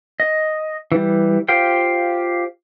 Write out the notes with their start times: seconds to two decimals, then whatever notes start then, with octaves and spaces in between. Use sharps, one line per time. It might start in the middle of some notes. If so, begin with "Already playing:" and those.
0.20 D#5
0.92 E3 G3
1.48 F4 G4 C5 F5 G5